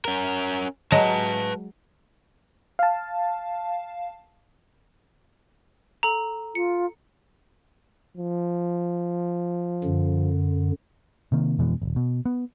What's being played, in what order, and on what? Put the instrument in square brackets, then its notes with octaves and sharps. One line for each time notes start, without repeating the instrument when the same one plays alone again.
[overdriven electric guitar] C#4 A#4
[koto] F#3 G#3 A#5 [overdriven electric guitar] B4 A5
[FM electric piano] F5 A5
[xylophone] A4 A#5
[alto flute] F4 [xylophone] C#7
[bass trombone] F3
[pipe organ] F#2 D3
[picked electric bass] C3 D#3 A#3
F2 B2 E3 G#3
D#1 G#1
B2
B3